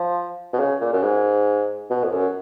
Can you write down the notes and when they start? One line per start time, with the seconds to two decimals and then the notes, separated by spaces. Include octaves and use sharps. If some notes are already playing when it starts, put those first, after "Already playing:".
Already playing: F3
0.53 B2
0.59 C#3
0.81 A#2
0.93 F#2
1.03 G#2
1.90 B2
2.04 F2
2.12 F#2